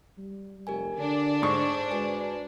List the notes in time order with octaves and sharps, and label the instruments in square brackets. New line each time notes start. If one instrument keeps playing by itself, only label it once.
[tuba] G3
[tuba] F1 [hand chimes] G4 A#4 G#5
[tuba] D3 [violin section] D4
[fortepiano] G#2 C#6 [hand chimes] C5 C7
[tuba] G#3 [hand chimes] F#4 B4 G#5